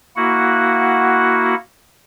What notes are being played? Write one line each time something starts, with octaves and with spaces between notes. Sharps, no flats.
A#3 E4 F#4 F#5